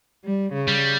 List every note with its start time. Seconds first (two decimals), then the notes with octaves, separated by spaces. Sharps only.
0.25 G3
0.53 C#3
0.68 G3